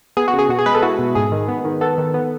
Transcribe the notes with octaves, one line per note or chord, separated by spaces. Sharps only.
B3 G#4
F#4
C#3 G#4
B2 F#4
G#4
G#3 B4
A4
E4 F#4
B2
G#2 G#4
D#3
B3
D#3
B3 A4
D#3
B3